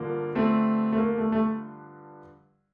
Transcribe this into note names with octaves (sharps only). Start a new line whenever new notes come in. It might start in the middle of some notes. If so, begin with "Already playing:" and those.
Already playing: G2 D3 F3 A#3
A3 C4
A3
A#3
A3
A3